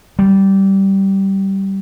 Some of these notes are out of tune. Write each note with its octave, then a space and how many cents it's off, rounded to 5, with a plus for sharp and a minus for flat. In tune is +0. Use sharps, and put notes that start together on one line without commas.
G3 -15